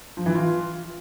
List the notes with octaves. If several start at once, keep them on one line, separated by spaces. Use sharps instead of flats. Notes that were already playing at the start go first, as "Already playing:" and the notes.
F3
E3
F4